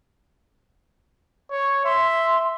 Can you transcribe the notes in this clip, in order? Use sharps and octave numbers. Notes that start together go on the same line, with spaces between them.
C#5
E5 C6